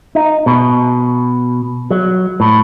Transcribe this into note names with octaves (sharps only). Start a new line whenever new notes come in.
D#4
B2
F#3
A2